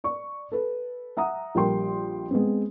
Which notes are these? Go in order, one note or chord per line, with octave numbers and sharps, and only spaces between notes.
D5 C#6
A4 B4
E5 F#5 A#5 D#6
A#1 G3 A#4 G5 C6
G#3 B3 C4